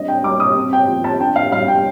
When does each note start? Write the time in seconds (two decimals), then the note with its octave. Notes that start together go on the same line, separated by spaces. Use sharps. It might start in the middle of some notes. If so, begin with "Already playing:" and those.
Already playing: G3 C4 D4 D#5
0.08 G5
0.24 G3 D6
0.40 D#6
0.56 C4
0.73 G5
0.88 F3
1.04 A5
1.20 D4 G5
1.36 F5
1.52 G3 F5
1.68 G5